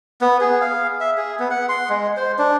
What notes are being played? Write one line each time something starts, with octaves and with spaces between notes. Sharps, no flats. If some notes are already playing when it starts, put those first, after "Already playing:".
B3
G#4
F5
E5
G#4
B3
F#5
C6
G#3
C5
D4